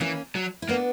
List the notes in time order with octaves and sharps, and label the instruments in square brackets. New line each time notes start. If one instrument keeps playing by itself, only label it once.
[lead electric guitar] E3 [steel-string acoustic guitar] A#3 C#4
[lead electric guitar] F#3
[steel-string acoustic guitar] E4
[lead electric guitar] A#3 [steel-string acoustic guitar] B3 D4